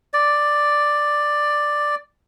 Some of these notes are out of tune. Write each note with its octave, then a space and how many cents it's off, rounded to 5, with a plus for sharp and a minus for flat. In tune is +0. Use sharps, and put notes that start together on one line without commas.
D5 +5